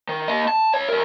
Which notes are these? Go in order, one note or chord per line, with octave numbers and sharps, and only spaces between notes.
D#3
A#3 D#5
A5
C#2 C#5
E2 A#4